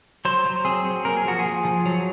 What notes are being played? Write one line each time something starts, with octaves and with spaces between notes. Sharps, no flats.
F#3 C5
F#3
C4 G#4
F#3
A#3 A#4
G#4
F3 F#4
G#4
F3
F3
F#3